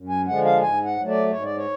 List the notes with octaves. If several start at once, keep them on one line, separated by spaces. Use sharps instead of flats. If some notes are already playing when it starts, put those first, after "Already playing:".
Already playing: F#2
G#5
D3 F3 G#3 F#5
F5
G#2 G#5
F#5
F#3 A3
D5
G#2 C#5
D5
C#5